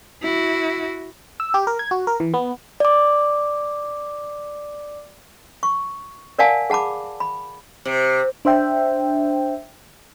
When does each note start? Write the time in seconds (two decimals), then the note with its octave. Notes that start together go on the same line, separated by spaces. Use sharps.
0.23 E4 F#4
1.40 E6
1.54 G4
1.67 A#4
1.79 G#6
1.91 F#4
2.07 A#4
2.20 E3
2.34 B3
2.80 D5 D6
5.63 C#6
6.39 A#4 D5 F5 F#5 G#5 A5
6.70 G#4 F#5 A5 B5 D6
7.20 B5
7.85 C3
8.45 D4 C5 E5 G5